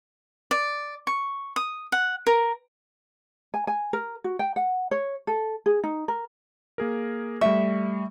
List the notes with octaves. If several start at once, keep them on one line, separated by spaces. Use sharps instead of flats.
D5
C#6
D#6
F#5
A#4
G#5
G#5
A#4
F#4
G5
F#5
C#5
A4
G#4
D#4
A#4
A#3 G#4 A#4
G3 A3 E5 C#6